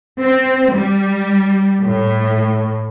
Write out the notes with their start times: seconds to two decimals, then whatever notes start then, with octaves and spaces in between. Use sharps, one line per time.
0.22 C4
0.73 G3
1.84 A2